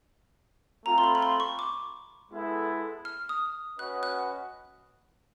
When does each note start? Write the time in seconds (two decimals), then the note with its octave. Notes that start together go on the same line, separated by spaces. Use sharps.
0.85 A3 C4 F4 A4 A#5
0.98 C6
1.04 B5
1.15 B5
1.22 C6
1.40 C#6
1.59 D6
2.32 G#3 B3 E4 A4
3.05 F6
3.29 D#6
3.78 C#4 F#4 B4 D#5 F#5 F#6
4.03 F#6